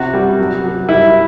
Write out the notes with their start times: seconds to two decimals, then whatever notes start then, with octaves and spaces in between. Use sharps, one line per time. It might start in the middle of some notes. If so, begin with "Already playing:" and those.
Already playing: C3 F#4
0.13 G3
0.39 F#3
0.64 F#3
0.89 G3 E4